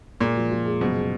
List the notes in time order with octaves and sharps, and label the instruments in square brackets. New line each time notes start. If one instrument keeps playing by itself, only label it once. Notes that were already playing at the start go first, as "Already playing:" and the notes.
[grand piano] A#2 [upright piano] G#3
[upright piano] F3
F3
G#3
[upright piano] F#1 [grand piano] B2